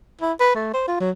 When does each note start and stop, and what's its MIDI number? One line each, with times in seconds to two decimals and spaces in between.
0.21 0.33 64
0.40 0.50 71
0.55 0.71 57
0.74 0.83 72
0.88 0.99 65
1.00 1.11 54